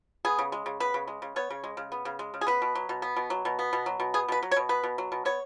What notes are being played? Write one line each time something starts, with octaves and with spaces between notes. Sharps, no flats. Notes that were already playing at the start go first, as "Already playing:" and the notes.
B3 G#4
C#3
G#3
C#3
B3 B4
C#3
G#3
C#3
B3 C#5
C#3
G#3
C#3
B3
C#3
G#3
C#3
G#4
B3 B4
B2
F#3
B2
B3
B2
F#3
B2
B3
B2
F#3
B2
B3 G#4
B2 B4
F#3
C#5
B2
B3 B4
B2
F#3
B2
B3 C#5